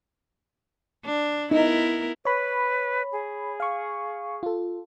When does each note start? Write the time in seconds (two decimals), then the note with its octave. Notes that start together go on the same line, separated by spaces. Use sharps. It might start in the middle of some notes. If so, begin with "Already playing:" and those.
1.05 D4
1.51 B3 D#4 E4 A#4
2.25 B4 C#5 B5
3.12 G#4
3.60 F5 C#6
4.43 F4 A4